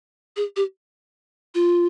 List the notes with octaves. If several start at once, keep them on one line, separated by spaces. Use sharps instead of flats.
G#4
G4
F4